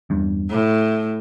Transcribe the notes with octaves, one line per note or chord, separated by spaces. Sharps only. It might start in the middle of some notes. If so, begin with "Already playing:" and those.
E2 G2
A2